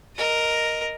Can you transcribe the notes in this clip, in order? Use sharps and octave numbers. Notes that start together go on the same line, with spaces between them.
A#4 D#5